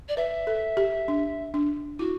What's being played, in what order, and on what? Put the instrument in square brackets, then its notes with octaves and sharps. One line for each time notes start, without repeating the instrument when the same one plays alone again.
[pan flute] D5
[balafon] B4 [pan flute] E5
[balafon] A4
G4
D4
D4
[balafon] E4 [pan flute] F#4